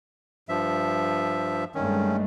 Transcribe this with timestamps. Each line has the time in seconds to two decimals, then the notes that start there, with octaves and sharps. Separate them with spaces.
0.49 G2 F3 E5
1.75 G2 D#3 G#3 A3 C#4